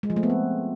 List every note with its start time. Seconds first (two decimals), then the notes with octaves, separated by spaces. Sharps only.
0.03 G#3
0.10 F3
0.16 A3
0.23 B3
0.30 C4